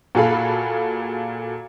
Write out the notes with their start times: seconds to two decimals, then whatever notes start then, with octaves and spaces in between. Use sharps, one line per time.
0.15 A#2 F#4 G#4 A4 F5 B5